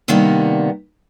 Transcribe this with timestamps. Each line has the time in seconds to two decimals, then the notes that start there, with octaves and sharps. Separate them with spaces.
0.08 C3 D#3 G3 A#3 B3 D4